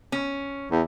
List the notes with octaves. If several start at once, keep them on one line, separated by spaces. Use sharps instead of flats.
C#4
E2